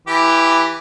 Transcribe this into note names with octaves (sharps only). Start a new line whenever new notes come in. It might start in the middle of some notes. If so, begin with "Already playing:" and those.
E3 G4